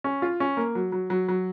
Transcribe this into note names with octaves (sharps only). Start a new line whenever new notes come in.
C#4
F4
C#4
A#3
F#3
F#3
F#3
F#3